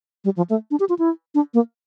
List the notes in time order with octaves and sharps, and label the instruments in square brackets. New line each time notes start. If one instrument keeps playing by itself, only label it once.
[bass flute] G3
F3
A3
D4
G4
F4
E4
D4
A#3